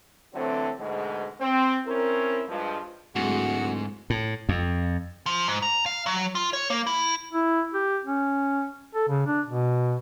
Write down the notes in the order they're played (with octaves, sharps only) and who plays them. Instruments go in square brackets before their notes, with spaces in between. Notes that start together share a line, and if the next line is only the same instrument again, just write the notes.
[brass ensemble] D3 E3 F#3 A3 C4
D2 G#2 B2 G#3
C4
C4 C#4 E4 A#4
G2 F3 G#3
[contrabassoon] D1 [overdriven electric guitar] G#2 [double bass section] G#3 A3 [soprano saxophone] F#4
[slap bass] A2
F2
[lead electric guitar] F3
G#2
A#5
F5
F#3
F4
C#5
A#3
E4
[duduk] E4
G4
C#4
A4
C#3
D4
B2